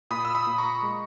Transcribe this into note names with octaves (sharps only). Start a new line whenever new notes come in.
A#2 B5 D#6
E6
B5 D#6
A#2
A#5 C#6
G#3